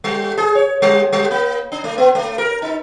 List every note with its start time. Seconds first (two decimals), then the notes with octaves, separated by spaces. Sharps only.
0.04 G3
0.37 G#4
0.55 C#5
0.82 G3
1.13 G3
1.31 A#3
1.72 D4
1.84 A3
1.98 B3
2.15 A3
2.38 A#4
2.62 D#4